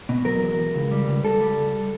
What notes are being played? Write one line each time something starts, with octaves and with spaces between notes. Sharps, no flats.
B2
F#3 A#4
E2
E2
C#2
G3
C#2
C#2 A4
G3
C#2